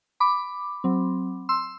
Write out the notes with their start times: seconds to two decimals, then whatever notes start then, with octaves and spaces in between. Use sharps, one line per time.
0.20 B5 D6
0.84 F#3 C4
1.49 C6 E6